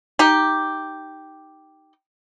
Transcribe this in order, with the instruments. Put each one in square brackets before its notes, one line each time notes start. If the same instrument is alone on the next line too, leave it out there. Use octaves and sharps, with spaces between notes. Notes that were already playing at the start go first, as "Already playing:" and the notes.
[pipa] D#4 G4